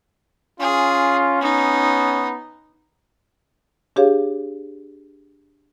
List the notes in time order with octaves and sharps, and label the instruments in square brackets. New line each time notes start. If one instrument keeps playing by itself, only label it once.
[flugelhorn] C#4 [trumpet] F4 [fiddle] G#4
[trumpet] B3 [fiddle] D#4
[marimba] D4 G4 G#4 C#5 F5